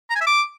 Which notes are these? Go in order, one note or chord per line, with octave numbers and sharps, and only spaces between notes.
A#5
G#5
E5
D6